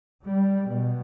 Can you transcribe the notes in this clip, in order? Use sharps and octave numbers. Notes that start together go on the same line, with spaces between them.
G3
B2